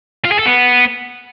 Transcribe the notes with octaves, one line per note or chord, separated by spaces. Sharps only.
F4
G#4
A4
B3